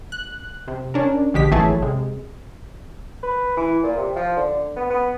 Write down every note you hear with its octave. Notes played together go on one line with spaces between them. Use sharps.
F#6
C3
C#4 D4 A#4
A#1 D3 G#3 G4 B6
G#1 E3 F#3 A3 G#4 A5
C3 G#3
B4
E3
A#2
C3
F3
D3
B3
B3